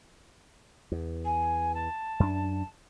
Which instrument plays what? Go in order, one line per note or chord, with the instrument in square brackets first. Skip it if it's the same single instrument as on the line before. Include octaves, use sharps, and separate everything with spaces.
[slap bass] E2
[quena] G#5
A5
[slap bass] F#2 D4